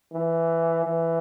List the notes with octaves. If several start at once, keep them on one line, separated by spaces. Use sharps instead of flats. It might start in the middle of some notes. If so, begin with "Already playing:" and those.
E3
E3